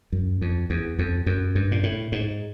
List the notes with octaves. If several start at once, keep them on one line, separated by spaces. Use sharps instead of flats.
F#2
F2
E2
F2
F#2
G2
A#2
A2
G#2